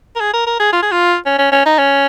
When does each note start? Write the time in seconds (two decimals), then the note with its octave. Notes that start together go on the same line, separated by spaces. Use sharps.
0.16 A#4
0.21 G#4
0.34 A#4
0.47 A#4
0.60 G#4
0.73 F4
0.83 G#4
0.92 F4
1.26 C#4
1.39 C#4
1.52 C#4
1.66 D#4
1.78 C#4